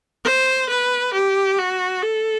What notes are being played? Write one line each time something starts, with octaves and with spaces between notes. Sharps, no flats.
C5
B4
G4
F#4
A4